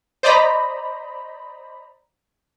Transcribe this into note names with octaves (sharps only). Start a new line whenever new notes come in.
C5 D5 D#5 A#5 B5